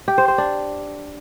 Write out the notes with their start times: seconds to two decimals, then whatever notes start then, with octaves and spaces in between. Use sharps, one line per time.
0.08 G4
0.18 C5
0.28 C5
0.38 D4